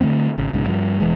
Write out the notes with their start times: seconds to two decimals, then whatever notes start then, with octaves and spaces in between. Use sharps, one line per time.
0.01 D3 E3 A3 C4
0.38 G#1 C#3
0.53 B1 G#2 C#3
0.66 G2 F3 G3
1.00 E1 E3 G#3